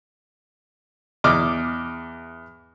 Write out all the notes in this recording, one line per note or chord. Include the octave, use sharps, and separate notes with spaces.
E2 D#5 D6 F6